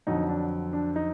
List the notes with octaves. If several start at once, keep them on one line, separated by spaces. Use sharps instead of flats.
F2 D3 F#3 D#4
D4
D4
D#4